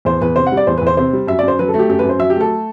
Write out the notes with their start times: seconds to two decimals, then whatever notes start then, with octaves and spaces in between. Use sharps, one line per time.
0.05 E2 C5
0.21 E2 B4
0.36 C3 C5
0.47 F#5
0.52 G3
0.57 D5
0.67 E2 C5
0.78 E2 B4
0.87 C5
0.97 C3 C5
1.13 G3
1.27 F#2 E5
1.39 D5
1.43 F#2 C5
1.59 F#3 B4
1.68 A4
1.74 A3
1.79 G4
1.89 F#2 G4
1.99 B4
2.04 F#2
2.09 C5
2.19 F#3 E5
2.30 G4
2.35 A3
2.41 A4